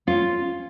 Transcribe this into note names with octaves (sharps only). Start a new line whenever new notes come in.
C#4 F4